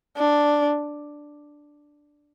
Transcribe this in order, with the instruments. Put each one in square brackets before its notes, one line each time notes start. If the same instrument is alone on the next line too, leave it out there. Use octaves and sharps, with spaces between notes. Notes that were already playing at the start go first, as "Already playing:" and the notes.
[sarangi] D4